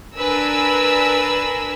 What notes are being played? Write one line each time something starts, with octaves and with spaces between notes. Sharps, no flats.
D4 A#4 B4 G#5 E6